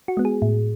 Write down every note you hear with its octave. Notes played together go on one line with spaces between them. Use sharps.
F#4
G#3 B3
G#4
A2